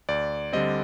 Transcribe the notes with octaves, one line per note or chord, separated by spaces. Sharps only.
D2 D5
D3 G3 C4 D#5